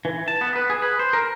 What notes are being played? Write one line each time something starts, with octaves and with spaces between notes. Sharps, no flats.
E3
A5
B3
B4
G#4
B4
C5
A#4